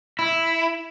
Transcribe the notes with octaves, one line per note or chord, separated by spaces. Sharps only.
E4